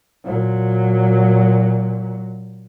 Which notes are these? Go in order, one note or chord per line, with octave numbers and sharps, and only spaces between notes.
A#2 F#3